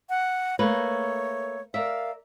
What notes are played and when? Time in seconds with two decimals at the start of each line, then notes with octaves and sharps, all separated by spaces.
0.09 F#5
0.59 A3 A#3 B4 C#5
1.74 A#4 D5 E5 F5